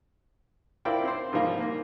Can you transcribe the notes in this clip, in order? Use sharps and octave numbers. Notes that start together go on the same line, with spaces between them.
E4 F4 A#4 C5 D5 G5
C4 C5
G#2 F3 G3 A#3
A#3